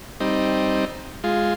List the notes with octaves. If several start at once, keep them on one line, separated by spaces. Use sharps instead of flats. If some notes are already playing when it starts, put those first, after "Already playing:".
G3 C4 D#4
G#3 F4